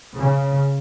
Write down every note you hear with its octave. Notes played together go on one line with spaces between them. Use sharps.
C#3